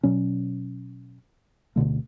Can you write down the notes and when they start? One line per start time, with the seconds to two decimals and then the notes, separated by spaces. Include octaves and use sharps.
0.03 B2 F#3 C#4
1.76 D1 B2 D3 A3